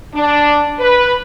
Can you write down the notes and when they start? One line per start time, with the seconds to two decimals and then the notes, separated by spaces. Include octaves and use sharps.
0.14 D4
0.80 B4